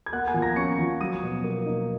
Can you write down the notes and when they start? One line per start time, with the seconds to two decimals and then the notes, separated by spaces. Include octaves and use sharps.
0.06 G#6
0.13 A#3 F#5 F#6
0.27 G#5 G#6
0.34 F3
0.42 A#5 A#6
0.56 C#4 C#6 C#7
0.79 F3
1.01 F#3 D#6 D#7
1.22 B2
1.44 A#3
1.66 D#4